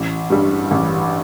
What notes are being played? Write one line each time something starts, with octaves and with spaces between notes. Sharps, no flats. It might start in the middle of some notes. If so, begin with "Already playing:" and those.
Already playing: A1
G2 G3
A1